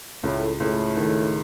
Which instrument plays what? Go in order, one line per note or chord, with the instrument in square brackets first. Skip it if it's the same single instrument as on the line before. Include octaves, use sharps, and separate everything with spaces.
[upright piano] C#2 [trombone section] A2
[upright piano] C#2 [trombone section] A2
[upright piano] D#3